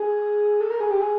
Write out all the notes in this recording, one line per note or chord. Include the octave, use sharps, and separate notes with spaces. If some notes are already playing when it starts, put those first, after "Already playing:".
Already playing: G#4
A4
A#4
G#4
G4
G#4